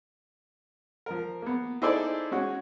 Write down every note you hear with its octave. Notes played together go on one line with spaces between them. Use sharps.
F3 A#4
A#3 B3
D#4 E4 G#4 A4 C5 D5
G#3 C#4 F#4